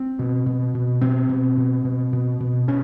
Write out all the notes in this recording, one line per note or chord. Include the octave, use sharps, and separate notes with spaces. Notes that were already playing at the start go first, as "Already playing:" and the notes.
Already playing: C4
B2
B2
B2
B2 C4
B2
B2
B2
B2
B2
B2 C#4